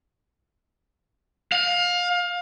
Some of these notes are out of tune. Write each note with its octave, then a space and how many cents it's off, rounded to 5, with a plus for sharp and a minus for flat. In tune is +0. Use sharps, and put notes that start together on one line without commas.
F5 +25